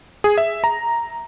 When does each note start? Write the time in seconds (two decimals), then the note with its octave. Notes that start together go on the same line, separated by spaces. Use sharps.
0.24 G#4
0.38 E5
0.64 A#5